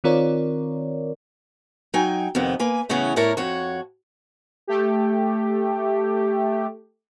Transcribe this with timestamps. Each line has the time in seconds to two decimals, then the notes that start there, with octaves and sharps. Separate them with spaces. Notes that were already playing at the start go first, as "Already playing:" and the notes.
0.04 D#3 C4 F4 A#4 C#5 D5
1.94 F#3 D#4 G5 G#5
2.35 F2 C3 D#3 B3
2.60 A#3 B4 G#5
2.89 A2 C#3 E3 B3 C#4
3.16 A2 D4 E4 A#4 C#5 A5
3.37 F2 F#4 C#5
4.67 A3 G4